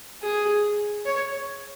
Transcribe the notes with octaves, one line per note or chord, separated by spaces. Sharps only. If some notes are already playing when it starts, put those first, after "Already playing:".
G#4
C#5